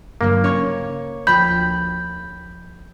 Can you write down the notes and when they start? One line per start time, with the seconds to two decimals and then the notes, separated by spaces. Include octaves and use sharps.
0.21 G2 D3 F#3 A#3
0.44 C#3 C#4 C#5 C#6
1.27 D2 F3 G5 B5 G6